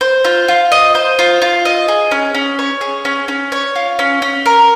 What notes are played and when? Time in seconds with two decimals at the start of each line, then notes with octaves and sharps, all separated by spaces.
0.01 C5
0.25 F4
0.48 F4
0.72 D#5
0.95 C5
1.19 F4
1.42 F4
1.65 D#5
1.88 G#4
2.11 C#4
2.34 C#4
2.59 C#5
2.81 G#4
3.05 C#4
3.28 C#4
3.52 C#5
3.76 F4
3.99 C#4
4.22 C#4
4.46 A#4